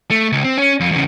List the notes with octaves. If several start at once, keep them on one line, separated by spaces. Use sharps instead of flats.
A3
C#2
C4
C#4
F2
E2 C#3